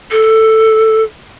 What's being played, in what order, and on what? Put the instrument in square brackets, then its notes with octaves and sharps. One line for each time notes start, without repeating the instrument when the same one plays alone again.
[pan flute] A4